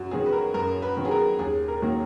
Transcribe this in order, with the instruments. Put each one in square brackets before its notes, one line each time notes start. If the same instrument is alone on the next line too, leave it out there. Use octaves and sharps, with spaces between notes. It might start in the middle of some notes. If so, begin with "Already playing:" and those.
Already playing: [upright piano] F#2 F#4
D#3 F#3 B3 G#4
B4
A#4
F#2 A#4
B4
D#3 F#3 B3
G#4
A#4
D#2 G#4
A#4
D#3 F#3 A#3